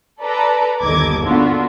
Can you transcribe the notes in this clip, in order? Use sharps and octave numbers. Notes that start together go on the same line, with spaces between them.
A4 B4 D5 A#5
G1 D#2 A4 D#5 D6 G#6
A#3 B3 D4 F4 F#4 A4